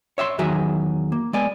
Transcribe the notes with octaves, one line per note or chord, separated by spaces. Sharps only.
C#5 E5 F5 C6
E2 D#3 F#3 F#4 G#4 E5
A#3
G#3 B3 D5 G#5